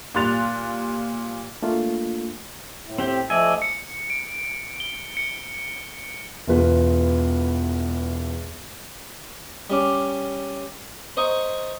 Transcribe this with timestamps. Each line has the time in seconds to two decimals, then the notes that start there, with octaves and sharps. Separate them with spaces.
0.14 A#2 G3 C6 F#6 A6 F7
1.63 A3 A#3 D4 F4
2.84 A2
2.98 C4 G4 G5
3.30 F3 A3 D5 D#5 G#5 E6
3.62 C#7
4.10 D7
4.80 G7
5.17 C#7
6.47 E1 E2 F4 B4
9.70 G3 C#4 D6
11.17 C5 D#5 A#5 C#6